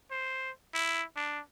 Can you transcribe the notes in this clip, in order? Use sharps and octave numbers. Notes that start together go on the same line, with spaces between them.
C5
E4
D4